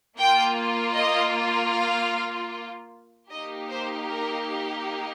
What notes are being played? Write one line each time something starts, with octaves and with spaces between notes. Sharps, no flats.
A#3 F4 G5
D#5
F5
A#3 D#4 G4 D#5
C5
A#4